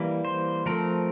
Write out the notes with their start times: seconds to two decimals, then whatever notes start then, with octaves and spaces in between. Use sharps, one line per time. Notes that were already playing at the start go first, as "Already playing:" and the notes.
Already playing: E3 G3 A#3
0.25 C5
0.66 F3 A3 C4 A#4